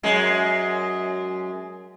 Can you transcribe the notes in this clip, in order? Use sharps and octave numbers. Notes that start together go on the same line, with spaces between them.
F#2 G#3